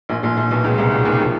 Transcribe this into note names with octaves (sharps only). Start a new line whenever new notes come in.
A#1 A#2
A#1 A#2
A#1 A#2
B1 B2
C#2 C#3
C2 C3
C#2 C#3
D#2 D#3
F3